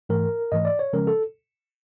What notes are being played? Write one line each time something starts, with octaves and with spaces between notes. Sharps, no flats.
G#2 E3 A3 A#4
G#2 E3 A3 D#5
D5
C#5
C#3 F3 G#3 C#4 A#4
A4